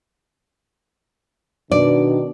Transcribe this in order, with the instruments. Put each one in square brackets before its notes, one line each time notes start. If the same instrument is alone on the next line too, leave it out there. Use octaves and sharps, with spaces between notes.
[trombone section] B2 D#3 [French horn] D4 [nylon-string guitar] D5